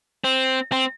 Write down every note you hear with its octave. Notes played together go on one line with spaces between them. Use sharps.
C4
C4